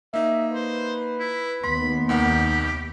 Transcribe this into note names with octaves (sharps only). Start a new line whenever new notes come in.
A#3 D#4 E5
B4 C5
E4
D#2 B3 B5 C6
C2 D#3 G4 F#5